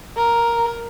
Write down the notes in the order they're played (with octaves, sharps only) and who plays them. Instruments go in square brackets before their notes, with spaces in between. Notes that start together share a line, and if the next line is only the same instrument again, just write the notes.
[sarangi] A#4